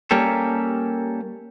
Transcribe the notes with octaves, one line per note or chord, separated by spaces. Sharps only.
G3 A#3 C#4 G4 A4